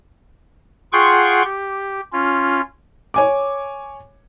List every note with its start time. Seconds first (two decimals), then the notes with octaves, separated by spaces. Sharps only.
0.93 F4 G#4 F#5 G5 C6 C#6
1.44 G4
2.13 C#4 F4
3.14 C#5 G#5 D6